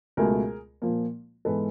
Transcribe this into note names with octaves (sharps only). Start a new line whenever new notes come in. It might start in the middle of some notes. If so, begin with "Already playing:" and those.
C#2 B2 F#3 A3 G#4 A#4
A#2 F3 A#3
G#2 E3 G#3 B3 A4 B4